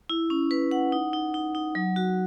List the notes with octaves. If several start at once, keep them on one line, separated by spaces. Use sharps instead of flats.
E4
C#4
B4
F#5
D#4
D#4
D#4
D#4
F#3
F#4